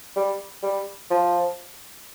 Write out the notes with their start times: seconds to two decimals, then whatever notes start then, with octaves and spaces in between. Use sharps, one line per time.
0.16 G3
0.63 G3
1.10 F3